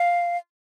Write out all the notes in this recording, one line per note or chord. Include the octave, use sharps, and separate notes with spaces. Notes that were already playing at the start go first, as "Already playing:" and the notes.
Already playing: F5